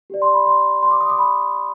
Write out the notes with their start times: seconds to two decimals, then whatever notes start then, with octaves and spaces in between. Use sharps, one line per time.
0.10 G4 D5
0.22 C6
0.34 B5
0.46 C6
0.83 C6
0.91 D6
1.01 D#6
1.10 D6
1.18 B5